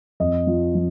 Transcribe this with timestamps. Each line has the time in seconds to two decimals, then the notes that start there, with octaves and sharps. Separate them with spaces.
0.20 F2 D#5
0.47 F3
0.75 F3